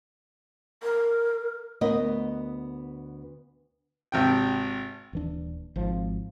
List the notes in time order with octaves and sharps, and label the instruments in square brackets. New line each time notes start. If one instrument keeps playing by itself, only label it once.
[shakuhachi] A#4
[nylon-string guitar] D2 B3 A#4 D#5
[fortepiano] G#1 C3 G5
[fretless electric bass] D#1 E3 D4
G#1 F3